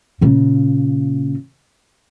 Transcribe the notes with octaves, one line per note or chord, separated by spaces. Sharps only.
A#2 C#3